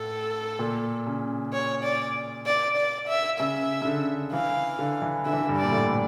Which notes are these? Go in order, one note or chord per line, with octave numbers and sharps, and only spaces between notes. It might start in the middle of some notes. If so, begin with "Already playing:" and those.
Already playing: A2 A4
A#2
C#3
C#5
D5
D5
D5
E5
C#3 E5
C#3
D3
E3 F5
D3
E3
D3 E5
E3
D3
G2
D5
A#2
A2